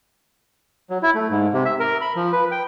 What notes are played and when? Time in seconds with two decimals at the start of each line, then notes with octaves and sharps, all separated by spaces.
0.90 F#3
1.02 E4
1.15 A3
1.30 G#2
1.53 C3
1.65 E5
1.80 A#4
2.01 B5
2.16 F3
2.33 B4
2.52 G5